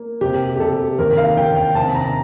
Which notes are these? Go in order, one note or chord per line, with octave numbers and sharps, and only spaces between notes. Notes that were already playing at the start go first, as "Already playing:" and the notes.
Already playing: A#3
C3 G4
G4
C3 A4
D#2 A#4
F5
D#2 G5
G5
C3 A5
A#5